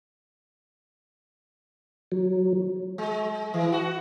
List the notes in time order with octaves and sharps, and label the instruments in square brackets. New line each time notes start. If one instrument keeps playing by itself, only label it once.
[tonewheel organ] F#3
[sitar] G#3
E3
F#4